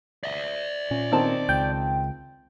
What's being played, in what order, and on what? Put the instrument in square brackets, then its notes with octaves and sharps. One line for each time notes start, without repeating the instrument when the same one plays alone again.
[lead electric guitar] D5 E5
[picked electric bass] A#2 C#4
[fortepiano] D#3 C4 A5
[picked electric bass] C#2 [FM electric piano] G5